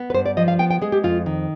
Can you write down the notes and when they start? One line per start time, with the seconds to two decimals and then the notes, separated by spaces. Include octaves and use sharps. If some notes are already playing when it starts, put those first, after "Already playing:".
Already playing: B3
0.10 B4
0.14 G2 C5
0.26 D5
0.37 F3 D#5
0.48 F5
0.59 B3 G5
0.71 G5
0.81 G#3 G#4
0.92 G4
1.03 F2 F4
1.26 D#3